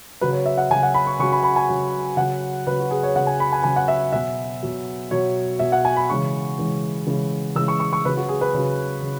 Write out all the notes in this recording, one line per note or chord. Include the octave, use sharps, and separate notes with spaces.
C#3 F#3 B4
C#5
E5
F#5
C#3 F#3 G#5
F#5
B5
C#6
C#3 F#3 C#6
B5
B5
G#5
C#3 F#3
C#3 F#3 F#5
C#3 F#3 B4
F#4
G#4
C#5
C#3 F#3 F#5
G#5
B5
G#5
C#3 F#3 G#5
F#5
E5
B2 F#3 E5
B2 F#3
B2 F#3 C#5
B2 F#3 E5
F#5
G#5
B5
C#3 E3 G#3 C#6
C#3 E3 G#3
C#3 E3 G#3
C#3 E3 G#3 E6
C#6
C#6
C#6
C#3 F#3 B4
F#4
G#4
B4
C#3 F#3
C#3